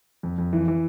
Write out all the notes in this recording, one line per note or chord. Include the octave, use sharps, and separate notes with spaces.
F2
F2
E3
E3